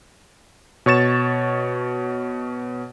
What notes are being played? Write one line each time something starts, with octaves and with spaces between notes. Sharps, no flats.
B2 C#5 C#6 A6 E7